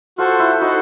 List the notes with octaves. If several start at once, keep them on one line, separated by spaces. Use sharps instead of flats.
F4 F#4 A4 C5
E4
D#4 F#4 A4 C5